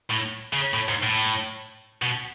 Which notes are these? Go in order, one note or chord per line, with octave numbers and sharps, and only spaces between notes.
A2
C#3
A2
G#2
A2
B2